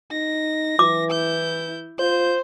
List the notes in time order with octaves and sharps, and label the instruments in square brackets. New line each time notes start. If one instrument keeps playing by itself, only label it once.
[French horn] D#4 [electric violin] A#6
[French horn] E3 [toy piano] D6
[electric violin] E4 G6
[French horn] F4 [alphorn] C5 [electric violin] G6